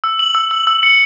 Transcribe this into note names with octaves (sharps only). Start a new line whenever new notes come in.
E6
F#7
E6
E6
E6
C#7